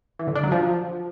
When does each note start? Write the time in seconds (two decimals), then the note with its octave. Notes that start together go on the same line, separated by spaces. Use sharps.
0.19 E3
0.27 D3
0.35 D4
0.44 F#3
0.52 F3